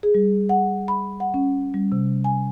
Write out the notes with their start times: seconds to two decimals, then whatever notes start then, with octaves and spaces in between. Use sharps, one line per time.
0.03 G#4
0.15 G3
0.49 F#5
0.88 B5
1.20 F#5
1.34 C#4
1.74 G3
1.92 C3
2.24 G#5